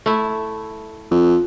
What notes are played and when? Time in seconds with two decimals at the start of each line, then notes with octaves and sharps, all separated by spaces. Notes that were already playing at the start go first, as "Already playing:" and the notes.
0.06 A3 E4
1.11 F2